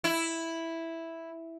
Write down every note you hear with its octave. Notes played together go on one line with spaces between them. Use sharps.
E4